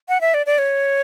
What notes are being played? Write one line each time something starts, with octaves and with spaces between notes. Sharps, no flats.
F#5
E5
D5
D5
C#5